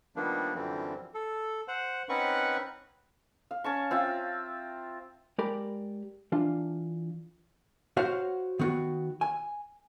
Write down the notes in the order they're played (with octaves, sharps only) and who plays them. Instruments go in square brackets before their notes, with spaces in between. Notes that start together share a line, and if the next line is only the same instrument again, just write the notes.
[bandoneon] D#3 F3 G3 A#3 B3 D4
F#2 D3 E3 F3 G3 C4
A4
C5 F#5
C4 C#4 D#4 B4 F#5 C#6
[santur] F5
C#4 A5 C#6
C4 F4 E5
[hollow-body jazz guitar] G#3 G4 A#4 D5 B5
E3 D4 F4
F#4 C5 C#5 F5 F#5
D#3 B3 F#4
G#5